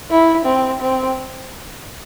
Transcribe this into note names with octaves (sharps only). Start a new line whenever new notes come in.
E4
C4
C4